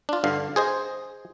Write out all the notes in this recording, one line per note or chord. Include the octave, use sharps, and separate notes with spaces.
D4 F4
G2 D3 F5
G#4 C5 D#5